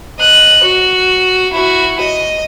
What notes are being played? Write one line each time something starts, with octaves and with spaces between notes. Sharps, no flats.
D#5 F#6
F#4
E4 F#4
D#5